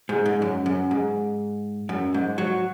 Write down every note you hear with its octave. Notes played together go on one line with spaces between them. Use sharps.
G#2
G#2
F#2
F#2
G#2
F#2
G#2
F#3